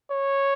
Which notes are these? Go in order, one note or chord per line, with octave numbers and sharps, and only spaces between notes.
C#5